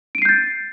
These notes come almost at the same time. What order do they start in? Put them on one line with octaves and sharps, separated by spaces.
D7 D#7 C7 G6 A6